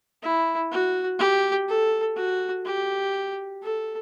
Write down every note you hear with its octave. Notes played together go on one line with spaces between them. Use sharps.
E4
F#4
G4
A4
F#4
G4
A4